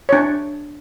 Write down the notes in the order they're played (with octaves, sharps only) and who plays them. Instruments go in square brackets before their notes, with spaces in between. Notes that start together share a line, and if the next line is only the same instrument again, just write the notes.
[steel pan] D4 C#5